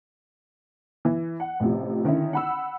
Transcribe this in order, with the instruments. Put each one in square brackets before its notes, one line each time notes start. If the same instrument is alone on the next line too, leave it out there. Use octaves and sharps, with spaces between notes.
[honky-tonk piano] E3
F#5
A1 A2 C3 F3
D3 D#3 C#4 D#4 E4
F#5 B5 E6